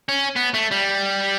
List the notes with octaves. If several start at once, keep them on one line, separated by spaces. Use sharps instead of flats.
C#4
B3
A3
G3